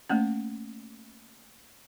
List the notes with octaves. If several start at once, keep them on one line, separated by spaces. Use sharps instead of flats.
A3 A#3 C#4